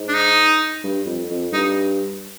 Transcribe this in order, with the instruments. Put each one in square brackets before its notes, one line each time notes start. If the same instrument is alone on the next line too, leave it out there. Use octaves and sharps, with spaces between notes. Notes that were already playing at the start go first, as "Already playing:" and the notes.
Already playing: [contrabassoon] G#2
[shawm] D4
D#4
[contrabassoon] G2
F2
F2
[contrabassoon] G2 [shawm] D#4